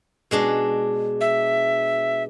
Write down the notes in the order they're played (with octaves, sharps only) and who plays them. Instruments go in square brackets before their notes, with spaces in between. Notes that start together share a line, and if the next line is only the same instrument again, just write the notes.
[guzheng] B2 G#3 D4
[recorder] E5